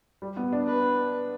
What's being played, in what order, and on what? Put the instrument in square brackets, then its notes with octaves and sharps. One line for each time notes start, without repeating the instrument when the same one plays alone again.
[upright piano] G3
B3
D4
[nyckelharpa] B4